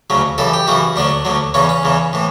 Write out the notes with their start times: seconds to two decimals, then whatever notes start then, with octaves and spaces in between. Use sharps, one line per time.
0.10 D2 C#3 F#3
0.38 F#2 C#3 E3 A4
0.54 G4
0.67 F#2 C#3 E3 F#4
0.96 D2 D3 F#3 D4
1.25 D2 D3 F#3
1.54 E2 C#3 E3 C#4
1.69 C#4
1.83 E2 C#3 E3
2.13 A2 E3